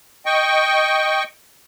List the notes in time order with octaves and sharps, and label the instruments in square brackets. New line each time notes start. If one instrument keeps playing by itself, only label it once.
[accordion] D#5 G5 C#6